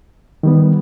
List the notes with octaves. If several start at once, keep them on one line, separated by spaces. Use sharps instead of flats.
D#3 G3 B3